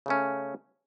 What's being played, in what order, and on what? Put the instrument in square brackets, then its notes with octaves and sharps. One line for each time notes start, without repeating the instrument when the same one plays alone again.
[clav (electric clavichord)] C#3 A3 C#4